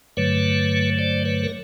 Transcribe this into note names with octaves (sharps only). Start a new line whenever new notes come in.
G2 D3 F#3 A3 B4 C#5
C5 D5
B4 C#5
A#4